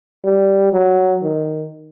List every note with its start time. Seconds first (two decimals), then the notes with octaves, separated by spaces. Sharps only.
0.24 G3
0.73 F#3
1.22 D#3